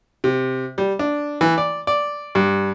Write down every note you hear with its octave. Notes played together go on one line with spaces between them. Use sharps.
C3
G3
D4
E3
D5
D5
G2